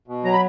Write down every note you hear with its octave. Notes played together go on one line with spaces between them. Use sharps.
B2
F#3 A#5
B5